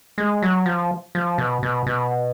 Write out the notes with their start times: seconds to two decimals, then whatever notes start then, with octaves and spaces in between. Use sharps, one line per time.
0.18 G#3
0.42 F#3
0.66 F3
1.15 F3
1.38 B2
1.63 B2
1.87 B2